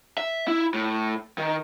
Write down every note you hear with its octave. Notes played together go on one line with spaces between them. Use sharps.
E5
E4
A2
D#3